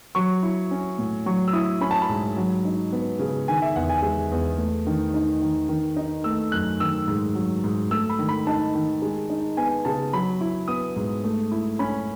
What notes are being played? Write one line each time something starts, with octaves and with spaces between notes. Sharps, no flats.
F#3 C#6
E4
C#4
A2
F#3 C#6
E6
E4 D#6
C#4 B5
A5
B5
G#2
F#3
D#4
B3
C#3
D#3 G#5
E5
E2 F#5
G#5
G#3
E2
A3
D#3
D#4
D#3
D#3
D#4
A3 E6
F#2 F#6
D#3 E6
G#2
F#3
G#2
A3 E6
B5
D#3
B5
D#4 A5
D#3
G#3
D#4
B3 G#5
C#3 A5
F#3 B5
E4
B3 D#6
G#2
A3
E4
C#4 B5